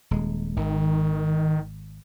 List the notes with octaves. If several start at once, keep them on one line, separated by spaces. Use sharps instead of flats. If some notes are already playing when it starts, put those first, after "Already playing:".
D#1 G#3
G#1 D#3